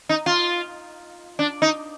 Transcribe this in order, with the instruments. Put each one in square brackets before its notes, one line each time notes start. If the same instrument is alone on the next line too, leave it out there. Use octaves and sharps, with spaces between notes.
[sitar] D#4
F4
D4
D#4